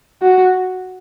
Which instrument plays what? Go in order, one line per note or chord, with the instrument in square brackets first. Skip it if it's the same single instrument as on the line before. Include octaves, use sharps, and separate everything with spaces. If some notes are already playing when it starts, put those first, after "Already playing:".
[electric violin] F#4